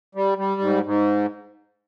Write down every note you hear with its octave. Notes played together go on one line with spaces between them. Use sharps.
G3
G3
G#2
G#2